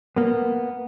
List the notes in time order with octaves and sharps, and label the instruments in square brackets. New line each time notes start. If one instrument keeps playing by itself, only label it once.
[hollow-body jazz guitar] A#3 B3